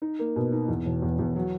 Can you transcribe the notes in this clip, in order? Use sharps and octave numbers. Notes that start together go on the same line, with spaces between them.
D#4
A#3
B2
D#4
E2
E1
E2
E2
F#3